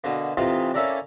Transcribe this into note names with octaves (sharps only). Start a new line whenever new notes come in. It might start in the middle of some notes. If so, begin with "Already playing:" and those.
B2 D3 A#3
A2 C3 E3 D#4 F4
A#3 C#4 E4 A4 A#4 D5